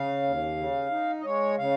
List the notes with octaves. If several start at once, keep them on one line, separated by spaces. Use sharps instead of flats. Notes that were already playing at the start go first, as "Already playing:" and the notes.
Already playing: C#3 F5
D#2
C#3
D#4
D#5
G#3 C#5
C#3 F5